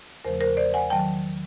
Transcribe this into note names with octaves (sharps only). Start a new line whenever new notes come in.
E2 C#3 F3 A3 A#4 C5
A#4 C5
C5 D5
F#5 G#5
D#3 F#3 G5 A5